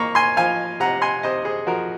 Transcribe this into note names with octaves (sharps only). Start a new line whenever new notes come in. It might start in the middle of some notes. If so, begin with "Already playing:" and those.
Already playing: A#3 A#5 C#6
G#5 C6
F3 F5 G#5
C3 F#5 A#5
G#5 C6
C3 C5 D#5
G#4 C5
F3 F#4 A#4